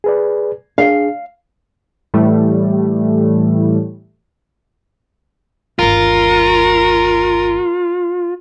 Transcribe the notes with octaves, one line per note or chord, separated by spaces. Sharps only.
G#4 B4 D5
D4 G#4 F5
A2 E3 G3 A3
G1 D#2 F4 A#4